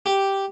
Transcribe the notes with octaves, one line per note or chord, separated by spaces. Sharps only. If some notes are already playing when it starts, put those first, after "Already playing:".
G4